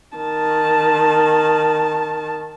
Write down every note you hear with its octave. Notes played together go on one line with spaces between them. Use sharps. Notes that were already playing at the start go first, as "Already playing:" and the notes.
D#3 A5